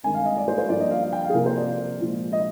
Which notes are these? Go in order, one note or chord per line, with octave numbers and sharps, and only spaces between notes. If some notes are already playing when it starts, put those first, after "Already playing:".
G2 D#3 G#3 C4 G#5
F5
D#5
D5
C5
C5
G2 F3 A#3 D5
D#5
F5
F5
G5
F5
G#4
C3 F3 A#3 A#4
C5
D5
A#2 F3 G#3
D#5